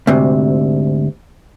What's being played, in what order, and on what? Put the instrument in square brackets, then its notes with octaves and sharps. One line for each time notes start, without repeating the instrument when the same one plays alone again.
[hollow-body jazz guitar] D2 G#2 C3